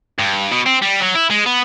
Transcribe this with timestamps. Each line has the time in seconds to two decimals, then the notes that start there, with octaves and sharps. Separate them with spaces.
0.19 G2
0.52 B2
0.66 C4
0.82 G3
1.00 F#3
1.15 E4
1.30 G#3
1.46 B3